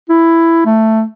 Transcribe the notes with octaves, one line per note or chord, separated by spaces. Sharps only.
E4
A3